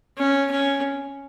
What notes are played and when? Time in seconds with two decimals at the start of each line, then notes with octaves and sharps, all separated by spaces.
0.18 C#4
0.51 C#4